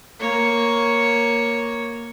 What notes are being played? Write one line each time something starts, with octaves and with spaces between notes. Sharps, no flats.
A#3 C#5